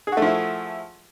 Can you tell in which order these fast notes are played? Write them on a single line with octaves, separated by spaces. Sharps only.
G#4 F#4 A3 F3 E4